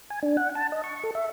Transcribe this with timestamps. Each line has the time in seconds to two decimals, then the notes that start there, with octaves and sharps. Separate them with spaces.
0.10 G#5
0.23 D4
0.37 F#5
0.55 A5
0.72 D#5
0.84 C#6
1.04 A4
1.15 E5